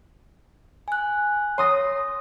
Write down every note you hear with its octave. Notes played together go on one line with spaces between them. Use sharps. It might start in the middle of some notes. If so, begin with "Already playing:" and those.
G#5 F#6
C#5 C6 D#6 A#6